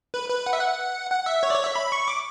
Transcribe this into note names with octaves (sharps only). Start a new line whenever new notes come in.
B4
B4
F#5
E5
F#5
F#5
E5
C#5
D5
C#5
E5
B5
C#6
D6